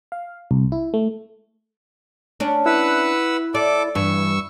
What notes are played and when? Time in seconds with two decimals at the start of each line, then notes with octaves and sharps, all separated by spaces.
0.12 F5
0.51 C2
0.72 E4
0.94 A3
2.40 C#4 D4
2.66 E4 B4 F#5 E6
3.55 A4 D5 D6
3.95 G2 E3 C#6 E6